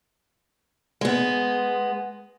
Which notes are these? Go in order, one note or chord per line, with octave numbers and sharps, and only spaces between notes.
G#3 B3